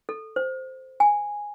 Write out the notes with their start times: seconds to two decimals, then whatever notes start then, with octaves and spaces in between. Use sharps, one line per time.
0.09 A4
0.36 C5
1.00 G#5